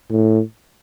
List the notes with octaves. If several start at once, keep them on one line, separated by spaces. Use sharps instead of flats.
A2